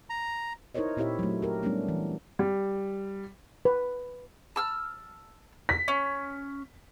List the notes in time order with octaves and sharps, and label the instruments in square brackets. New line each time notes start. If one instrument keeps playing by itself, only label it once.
[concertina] A#5
[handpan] D#4 E4 A#4 C5 C#5 D#5
A#2 C4 E4 G4 C#5 E5
F#3 A3
G4 A#4
G3 A3 B3 C#4 D4
E3
[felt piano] G3
[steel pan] B4
[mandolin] A5 E6 F6
[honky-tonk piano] B6
[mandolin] C#4